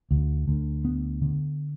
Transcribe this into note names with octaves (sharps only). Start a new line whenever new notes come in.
D2
D2
B3
D3